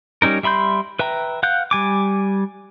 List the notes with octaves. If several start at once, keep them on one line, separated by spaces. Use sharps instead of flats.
G3 C#4 D#4 A#4
G3 E5 B5 C6 G6
B4 E5 G5 A#5
F5 F#5 F#6 G6
G3 G#5 D6